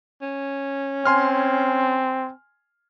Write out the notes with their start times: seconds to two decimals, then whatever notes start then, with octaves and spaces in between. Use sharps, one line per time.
0.22 C#4
1.06 C4 G#5 C6 F6